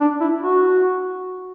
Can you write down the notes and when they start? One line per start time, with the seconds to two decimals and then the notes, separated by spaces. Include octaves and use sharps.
0.01 D4
0.21 E4
0.42 F#4